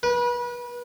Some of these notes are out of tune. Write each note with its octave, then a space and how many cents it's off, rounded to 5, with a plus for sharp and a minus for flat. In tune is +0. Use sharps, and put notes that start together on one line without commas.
B4 -30